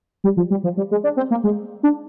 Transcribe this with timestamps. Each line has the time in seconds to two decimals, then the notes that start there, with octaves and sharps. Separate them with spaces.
0.24 G3
0.37 F3
0.51 G3
0.64 F3
0.77 G3
0.91 G#3
1.04 D4
1.17 C4
1.31 A#3
1.44 G#3
1.83 D4